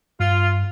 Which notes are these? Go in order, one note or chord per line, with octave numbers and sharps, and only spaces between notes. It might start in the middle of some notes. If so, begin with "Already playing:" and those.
G2 F4